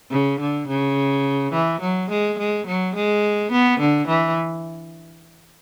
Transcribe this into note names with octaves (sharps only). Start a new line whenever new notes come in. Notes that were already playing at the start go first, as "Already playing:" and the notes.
C#3
D3
C#3
E3
F#3
G#3
G#3
F#3
G#3
B3
D3
E3